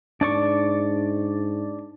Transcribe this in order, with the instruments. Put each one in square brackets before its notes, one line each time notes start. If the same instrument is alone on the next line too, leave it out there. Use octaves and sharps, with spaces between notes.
[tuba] G#2 [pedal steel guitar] D4 D5 C#6